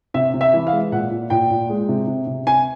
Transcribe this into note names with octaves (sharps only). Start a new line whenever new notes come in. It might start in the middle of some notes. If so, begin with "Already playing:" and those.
C3 E5
C3
E5
E3
F5
G#3
A#2 F#5
A#2
A#2 G5
A#2
G#3
C3
C3
C3
C3 G#5